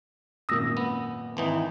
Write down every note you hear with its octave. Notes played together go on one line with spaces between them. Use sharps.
G#1 F#2 A#2 D#6 E6 A#6
B3
G#1 E3 D#4